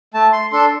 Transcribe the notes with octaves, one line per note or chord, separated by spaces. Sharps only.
A3 A5
C6
D4 A4 C6